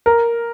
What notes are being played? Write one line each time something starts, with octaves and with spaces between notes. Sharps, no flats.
A#4